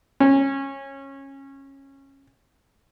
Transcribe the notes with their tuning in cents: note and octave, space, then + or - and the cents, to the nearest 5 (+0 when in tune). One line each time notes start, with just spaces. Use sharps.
C#4 -20